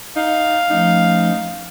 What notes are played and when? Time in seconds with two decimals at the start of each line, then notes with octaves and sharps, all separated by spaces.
0.17 D#4 F5
0.70 F3 A3 C#4 D#4